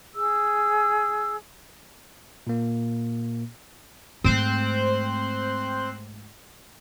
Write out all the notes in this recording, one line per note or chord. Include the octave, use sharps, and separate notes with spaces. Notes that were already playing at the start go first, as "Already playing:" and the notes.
G#4 E6
A#2 A#3
G#2 A3 C4 C5 F#6